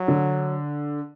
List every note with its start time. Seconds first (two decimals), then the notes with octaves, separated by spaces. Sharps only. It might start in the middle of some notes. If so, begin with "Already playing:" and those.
Already playing: F#3
0.08 D3